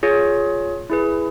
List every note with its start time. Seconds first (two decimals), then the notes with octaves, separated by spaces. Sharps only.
0.03 F4 G#4 C#5
0.90 E4 G#4 B4